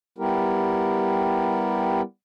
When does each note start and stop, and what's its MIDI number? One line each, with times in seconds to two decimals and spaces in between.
0.18 2.02 55
0.18 2.02 59
0.18 2.02 64
0.18 2.02 67
0.18 2.02 70